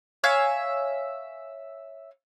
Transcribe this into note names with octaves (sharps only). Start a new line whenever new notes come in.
C#5 E5 F5 G#5